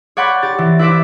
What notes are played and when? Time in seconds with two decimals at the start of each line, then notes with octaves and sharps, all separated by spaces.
0.17 C#5 D5 F#5 B5 C6 G6
0.42 G4 A6
0.58 E3
0.79 E4 B4 C5 D5 E5